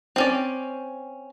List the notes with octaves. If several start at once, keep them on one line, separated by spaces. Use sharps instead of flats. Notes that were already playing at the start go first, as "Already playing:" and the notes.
C4 C#4 D5